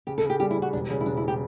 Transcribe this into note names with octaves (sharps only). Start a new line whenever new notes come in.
C#3 G4
A4
C#3
G4
G3 G4
E4
G3
F#4
E1 D4
C#3 C#4
E4
E1 D4
E4
G4